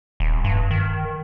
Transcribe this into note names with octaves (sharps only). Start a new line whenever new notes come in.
D#1
G2
D#3